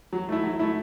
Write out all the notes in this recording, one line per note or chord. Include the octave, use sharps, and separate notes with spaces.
F#3
A3 E4
F#3
A3 E4